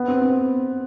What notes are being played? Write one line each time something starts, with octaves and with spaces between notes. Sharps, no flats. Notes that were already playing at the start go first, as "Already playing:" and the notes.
Already playing: B3
C4
C4